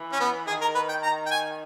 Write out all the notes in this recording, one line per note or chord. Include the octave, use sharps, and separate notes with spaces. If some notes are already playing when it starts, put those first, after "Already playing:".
Already playing: E3
C#4
B3
D#3 G#4
A#4
B4
G5
A#5
G5
G#5